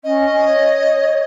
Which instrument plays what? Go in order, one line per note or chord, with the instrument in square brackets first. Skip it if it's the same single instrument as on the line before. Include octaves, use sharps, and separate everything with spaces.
[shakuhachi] C#4 [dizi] D#5
[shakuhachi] C#5